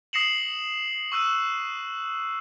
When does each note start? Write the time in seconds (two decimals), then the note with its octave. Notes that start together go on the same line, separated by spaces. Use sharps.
0.13 D#6 A#6 C7 C#7 E7 F#7
1.12 C#6 E6 F#6 D#7